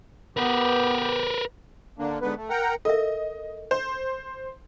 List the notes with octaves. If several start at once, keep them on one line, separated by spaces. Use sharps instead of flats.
B3 G4 A#4 B4
D3 A#3 D4
G#2 D3 B3 B4
A3
A#4 F#5 G5 A#5
A4 A#4 D#5 E5
C5